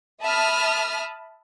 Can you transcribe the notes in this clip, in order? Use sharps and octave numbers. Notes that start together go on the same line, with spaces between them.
E5 A5 B5 D#6 F6